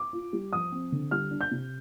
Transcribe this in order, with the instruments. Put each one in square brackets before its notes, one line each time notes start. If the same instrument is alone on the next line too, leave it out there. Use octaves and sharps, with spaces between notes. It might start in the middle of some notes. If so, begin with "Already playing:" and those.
Already playing: [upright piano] D6
F4
G3
F3 D#6
C4
D3
G3 F6
D4
G6
C3